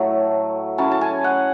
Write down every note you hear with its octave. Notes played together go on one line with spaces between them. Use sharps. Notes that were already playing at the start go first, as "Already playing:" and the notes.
Already playing: A2 F#3 A3 A5
F#3 C#4 E4 A5
A5
G#5
F#5